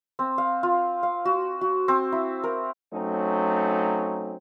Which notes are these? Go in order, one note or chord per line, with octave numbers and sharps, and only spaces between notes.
C4
F5
F4
F5
F#4
F#4
C4
E4
A#4
F#3 A3 C4 C#4 D#4